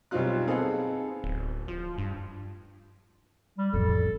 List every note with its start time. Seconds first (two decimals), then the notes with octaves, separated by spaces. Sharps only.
0.11 B1 G3 C4 D#4 F4 F#6
0.47 B3 C4 D#4 G#4 A4 F5
1.24 D1
1.68 F3
1.98 G2
3.58 G3
3.73 A1 F2 A4